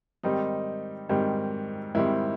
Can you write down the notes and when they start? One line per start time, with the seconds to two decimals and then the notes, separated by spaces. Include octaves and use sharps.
0.23 G#2 D#3 G3 C4 D#4
1.09 G#2 D#3 G3 C4
1.95 G#2 D#3 G3 C4 E4